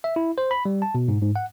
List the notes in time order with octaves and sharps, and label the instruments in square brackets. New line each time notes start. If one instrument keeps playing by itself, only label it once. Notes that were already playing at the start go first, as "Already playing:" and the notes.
[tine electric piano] E5
E4
C5
B5
G3
A5
B2
G#2
G#2
F#5